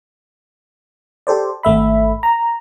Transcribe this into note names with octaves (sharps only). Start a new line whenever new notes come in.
G4 A4 C5 D5
G#1 A3 E5 B5
A#5